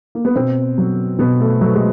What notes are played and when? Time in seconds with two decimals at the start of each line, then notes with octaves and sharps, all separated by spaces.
0.15 A#3
0.25 B3
0.36 B2 C4
0.78 F#3
1.19 B2 B3
1.40 A3
1.61 F#3 A3
1.74 G#3